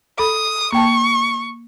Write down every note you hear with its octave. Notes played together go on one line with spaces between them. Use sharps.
A4 B5 D#6
A#3 G5 A5 C#6